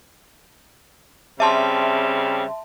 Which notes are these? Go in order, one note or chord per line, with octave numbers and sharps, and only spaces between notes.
C#3 G3 C4 E5 A5 C6